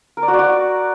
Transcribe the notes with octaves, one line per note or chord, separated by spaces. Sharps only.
A#4
D5
F#4
D5
F#4